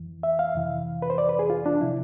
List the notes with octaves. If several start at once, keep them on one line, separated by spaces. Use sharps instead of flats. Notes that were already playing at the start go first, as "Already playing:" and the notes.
Already playing: F2 E3
E5
F5
F2 C3 E3
B4
C5
D5
B4
G#4
F4
D4
C3 F3 E4